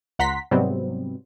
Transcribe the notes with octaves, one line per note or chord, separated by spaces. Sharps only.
C#2 F#5 A#5 C6 B6
G#2 C3 F#3 G3 B3 C4